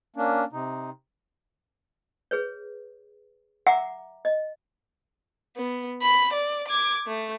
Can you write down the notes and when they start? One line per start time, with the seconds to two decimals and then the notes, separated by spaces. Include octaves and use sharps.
0.16 A#3 C#4 D4
0.53 C3 D#4
2.31 G#4 B4 C#5
3.67 E5 F#5 A#5 D6
4.25 D#5
5.56 B3
6.01 B5
6.33 D5
6.68 D6 G#6
7.07 A3